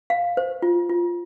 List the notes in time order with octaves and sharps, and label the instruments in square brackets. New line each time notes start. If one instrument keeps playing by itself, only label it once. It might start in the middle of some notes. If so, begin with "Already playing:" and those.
[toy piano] F5
C5
F4
F4